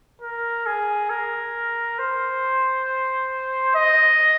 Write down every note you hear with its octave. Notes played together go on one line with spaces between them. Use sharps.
A#4
G#4
A#4
C5
D#5